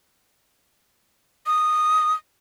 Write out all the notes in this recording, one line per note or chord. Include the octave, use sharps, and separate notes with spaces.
D#6